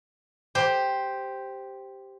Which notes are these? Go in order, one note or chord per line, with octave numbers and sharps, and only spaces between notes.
G4 C5